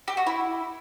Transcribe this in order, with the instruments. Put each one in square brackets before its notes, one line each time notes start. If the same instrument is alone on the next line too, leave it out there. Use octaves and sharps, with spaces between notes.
[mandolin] G4
F#4
E4